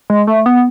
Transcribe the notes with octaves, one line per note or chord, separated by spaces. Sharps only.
G#3
A3
B3